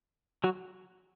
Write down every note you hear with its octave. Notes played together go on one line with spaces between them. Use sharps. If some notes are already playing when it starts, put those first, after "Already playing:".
F#3 F#4